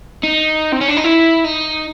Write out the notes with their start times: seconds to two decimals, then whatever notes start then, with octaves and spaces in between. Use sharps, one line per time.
0.24 D#4
0.73 C4
0.81 C#4
0.88 D4
0.97 D#4
1.04 E4
1.44 D#4